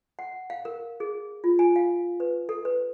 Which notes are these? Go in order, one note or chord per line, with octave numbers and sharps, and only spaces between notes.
F#5
F5
A#4
G#4
F4
G#5
F5
B4
A4
B4